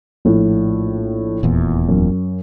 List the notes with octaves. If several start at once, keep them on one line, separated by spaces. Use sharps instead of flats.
A#1 A2
D#1 E2 A#2
F#2